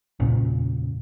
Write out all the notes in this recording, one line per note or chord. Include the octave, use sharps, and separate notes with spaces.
E2 A#2 C#3